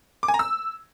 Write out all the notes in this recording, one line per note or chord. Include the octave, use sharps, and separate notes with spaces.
D6
G#5
A#5
E6